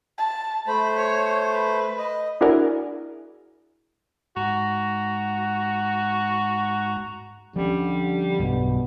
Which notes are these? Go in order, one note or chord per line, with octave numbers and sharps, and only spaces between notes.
A5
A3 C5 B5
C#5
B4
D#5
D4 E4 F#4 G#4 A#4 D5
G#2 F#4 A#5
D3 F3 G3 C#4
B1 G2 B2